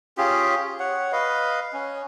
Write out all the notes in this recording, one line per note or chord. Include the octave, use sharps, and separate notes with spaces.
C#4 F4 G4 G#4
C#5 F#5
B4 D#5 F5
C#4